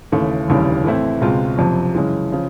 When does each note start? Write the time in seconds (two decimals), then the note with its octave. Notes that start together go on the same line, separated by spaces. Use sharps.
0.12 D#2 C#3 E3 A3
0.48 F1 D#2 C#3 E3 G3
0.84 A2 E3 A3 C4 E4
1.21 C#2 B2 G#3 C4 F4
1.57 F#1 F2 C3 F3
1.94 F#2 C#3 E3 G#3
2.32 C#3 F3